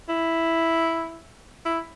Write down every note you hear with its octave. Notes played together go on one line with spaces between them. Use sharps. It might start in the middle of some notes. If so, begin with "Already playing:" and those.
E4
E4